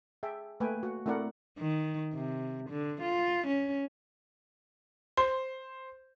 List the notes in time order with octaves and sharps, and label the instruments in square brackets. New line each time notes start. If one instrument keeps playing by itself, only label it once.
[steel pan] G#4 E5 G5 A5
A3 A#3 B4 G5 G#5
F#4 F#5
A3 C4 E4 A#4 D5 F#5
[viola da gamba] D#3
C3
D3
F4
C#4
[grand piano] C5 [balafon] C6